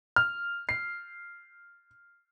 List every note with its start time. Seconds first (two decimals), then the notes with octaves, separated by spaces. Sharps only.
0.16 F6
0.69 C7